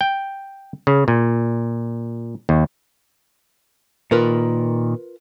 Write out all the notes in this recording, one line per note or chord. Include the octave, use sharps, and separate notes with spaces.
G5
C#3
A#2
D#2
A#2 D#3 F4 A#4 B4